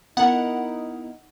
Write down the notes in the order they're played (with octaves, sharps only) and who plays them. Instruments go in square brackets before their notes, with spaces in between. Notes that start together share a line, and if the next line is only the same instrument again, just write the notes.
[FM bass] B3 [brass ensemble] D#4 [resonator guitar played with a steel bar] E4 A#4 [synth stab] F#5